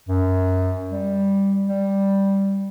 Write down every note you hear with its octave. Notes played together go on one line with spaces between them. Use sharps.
F#2
G3
G3